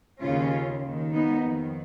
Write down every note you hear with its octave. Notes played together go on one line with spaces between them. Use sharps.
D#2 C#3 C#4 F4
D#2 D#3
B3 D#4
F2 D#3